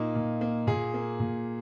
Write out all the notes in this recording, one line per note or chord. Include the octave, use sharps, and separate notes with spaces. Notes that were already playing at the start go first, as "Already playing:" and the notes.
Already playing: A#2 A#3 D#4
A#2
A#3
A#2 G#4
A#3
A#2